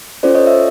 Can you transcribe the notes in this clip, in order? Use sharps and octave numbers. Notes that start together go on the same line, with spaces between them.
C#4 F4 A4 C5 D5
C#5 D#5
D5 E5